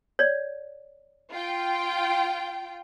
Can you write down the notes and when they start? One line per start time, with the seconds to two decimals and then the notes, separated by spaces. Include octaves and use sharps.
0.19 C#5 D5
1.32 F4 G5